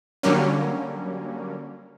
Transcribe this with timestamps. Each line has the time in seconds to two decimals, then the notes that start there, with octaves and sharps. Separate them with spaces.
0.23 D3 F#3 G3 A#3 C#4